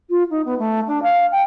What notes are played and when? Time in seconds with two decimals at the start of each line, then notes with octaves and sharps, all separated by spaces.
0.09 F4
0.30 D#4
0.45 B3
0.58 A3
0.87 D4
1.02 F5
1.31 G5